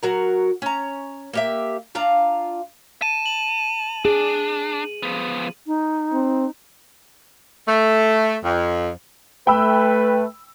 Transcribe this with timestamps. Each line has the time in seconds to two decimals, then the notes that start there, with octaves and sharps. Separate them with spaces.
0.03 F#3 F#4 A#4
0.62 C#4 A#5
1.33 A#3 G4 E5
1.95 D4 F4 F5 A#5
3.02 A5 D#7
3.26 F#7
4.05 D4 G#4
5.03 F3 B3
5.67 D#4
6.13 C4
7.67 A3
8.44 F2
9.47 A3 B4 G5 B5 E6